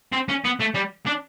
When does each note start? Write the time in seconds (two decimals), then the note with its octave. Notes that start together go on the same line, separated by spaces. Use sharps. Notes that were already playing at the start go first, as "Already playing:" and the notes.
0.12 C4
0.28 C#4
0.44 B3
0.60 A3
0.74 G3
1.06 D4